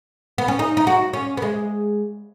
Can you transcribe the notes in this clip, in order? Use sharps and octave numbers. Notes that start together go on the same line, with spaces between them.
B3
C#4
D#4
D#4
F#4
C#4
B3
G#3